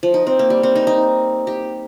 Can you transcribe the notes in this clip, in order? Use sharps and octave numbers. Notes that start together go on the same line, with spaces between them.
F3
D#4
C4
A#3
G3
C4
D#4
D#4
G4